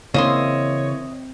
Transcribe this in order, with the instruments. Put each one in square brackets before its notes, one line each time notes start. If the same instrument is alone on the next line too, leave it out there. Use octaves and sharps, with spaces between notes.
[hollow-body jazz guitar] C#3 E3 A#3 [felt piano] C4 [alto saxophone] C#5 [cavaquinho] D#5 E5 C6